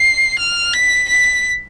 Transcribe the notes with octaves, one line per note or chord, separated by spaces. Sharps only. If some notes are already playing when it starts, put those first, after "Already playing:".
Already playing: C7
F6
B6
B6